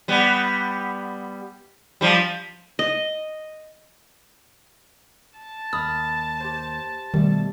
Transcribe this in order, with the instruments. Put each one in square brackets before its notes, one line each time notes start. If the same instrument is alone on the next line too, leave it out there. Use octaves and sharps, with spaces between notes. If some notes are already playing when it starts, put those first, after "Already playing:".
[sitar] G3 B3
F3 G3
[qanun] D#5
[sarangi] A5
[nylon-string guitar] D#2 [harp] B5 F6 [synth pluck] D#6
[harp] G4 C5
[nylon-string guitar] B2 G3 [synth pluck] D#3 [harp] A3